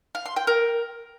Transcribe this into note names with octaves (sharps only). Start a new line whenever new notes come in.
F5
C6
G5
A#4